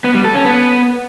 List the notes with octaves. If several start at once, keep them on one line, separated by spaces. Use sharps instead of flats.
B3
G3
A4
C#4
B3